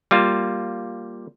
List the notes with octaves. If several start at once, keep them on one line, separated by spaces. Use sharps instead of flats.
G3 A#3 F4